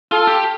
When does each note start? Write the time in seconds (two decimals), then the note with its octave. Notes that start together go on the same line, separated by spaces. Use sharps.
0.12 F4 A4
0.27 G4